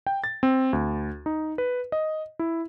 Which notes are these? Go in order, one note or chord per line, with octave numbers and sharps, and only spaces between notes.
G5
A6
C4
D2
D#4
B4
D#5
E4